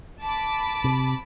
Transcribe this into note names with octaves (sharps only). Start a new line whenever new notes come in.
A5 B5 D6
C3